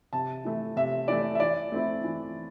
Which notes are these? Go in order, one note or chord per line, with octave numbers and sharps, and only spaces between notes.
C3 A5
E3 A3
C3 E5
E3 A3 D5
E5
E3 D5
A3 C4 E4
E3